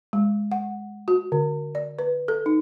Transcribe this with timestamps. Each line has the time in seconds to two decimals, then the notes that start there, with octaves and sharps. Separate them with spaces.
0.13 G#3
0.52 F#5
1.08 F#4
1.32 D3
1.75 D5
1.99 B4
2.28 A4
2.46 D#4